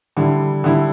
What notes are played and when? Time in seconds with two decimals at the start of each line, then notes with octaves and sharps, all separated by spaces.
0.17 D3 G3 E4
0.64 D3 G3 E4